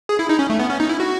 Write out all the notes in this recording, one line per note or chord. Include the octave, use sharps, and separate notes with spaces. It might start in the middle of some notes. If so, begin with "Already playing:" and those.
G#4
E4
D#4
C#4
A3
B3
C#4
D#4
E4
F#4